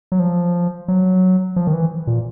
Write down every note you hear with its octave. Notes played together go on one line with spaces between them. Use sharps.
F#3
F3
F#3
F3
D#3
E3
A#2